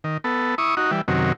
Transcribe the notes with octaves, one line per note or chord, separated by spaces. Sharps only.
D#3
B3 A4
E4 C#6 D#6
D#4 F#4
E3 G3
F#2 C3 D#3 F#3